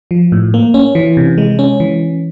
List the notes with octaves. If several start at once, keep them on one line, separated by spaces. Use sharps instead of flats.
F3
A2
A#3
C#4
E3
C3
G#3
C#4
E3